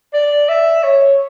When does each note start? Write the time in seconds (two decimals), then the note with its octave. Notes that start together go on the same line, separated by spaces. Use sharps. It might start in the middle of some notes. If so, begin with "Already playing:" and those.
0.13 D5
0.49 E5
0.83 C#5